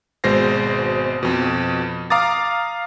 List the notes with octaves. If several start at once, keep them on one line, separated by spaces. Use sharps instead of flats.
G#1 B2 G#3 C5 A#6 C7
F2 B2
F5 A#5 D6 D#6 A6